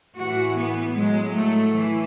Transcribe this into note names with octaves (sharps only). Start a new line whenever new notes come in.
A2 E3 F#4
B3
A2 F#3 G#3
A3
E3